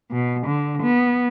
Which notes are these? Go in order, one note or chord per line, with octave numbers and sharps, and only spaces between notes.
B2
D3
B3